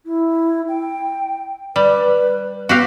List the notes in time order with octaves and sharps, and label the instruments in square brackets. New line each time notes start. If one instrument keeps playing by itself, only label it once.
[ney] E4
G5
[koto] G3 [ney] B4
[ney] B3 [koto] F#4 G4 F5